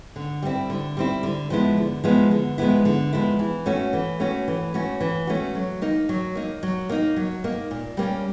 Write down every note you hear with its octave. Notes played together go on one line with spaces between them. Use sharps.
D3
G3 C4 E4
D3
G3 C4 E4
D3
F3 G#3 B3 E4
D3
F3 G#3 B3 E4
D3
F3 G#3 B3 E4
D3
F3 G#3 B3 E4
E3
A3 C#4 F#4
E3
A3 C#4 F#4
E3
A3 C#4 F#4
E3
A3 C#4 F#4
F#3
A#3 D#4
F#3
A#3 D#4
F#3
A#3 D#4
F#3
A#3 D#4
A#2
G3 A#3 C#4